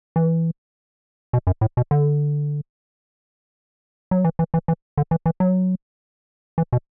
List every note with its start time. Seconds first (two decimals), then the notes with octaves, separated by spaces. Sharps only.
0.16 E3
1.33 B2
1.47 F#2
1.61 A2
1.77 B2
1.91 D3
4.11 F#3
4.25 E3
4.39 E3
4.54 E3
4.68 E3
4.98 D3
5.11 E3
5.26 E3
5.40 F#3
6.58 E3
6.73 B2